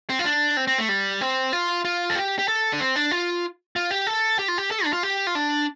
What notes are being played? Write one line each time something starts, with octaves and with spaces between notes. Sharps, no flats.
C4
F4
D4
C4
C4
A3
G3
C4
F4
F4
A4
G4
G4
A4
D4
C4
D4
F4
F4
G4
A4
G4
F4
G4
A4
D4
F4
G4
F4
D4